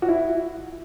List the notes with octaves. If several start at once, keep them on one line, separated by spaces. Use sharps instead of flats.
F#4
E4